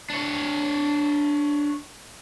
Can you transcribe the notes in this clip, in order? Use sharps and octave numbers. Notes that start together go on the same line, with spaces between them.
D4 C#5